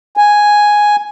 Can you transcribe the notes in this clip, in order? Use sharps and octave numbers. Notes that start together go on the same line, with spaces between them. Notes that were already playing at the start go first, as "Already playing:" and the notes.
G#5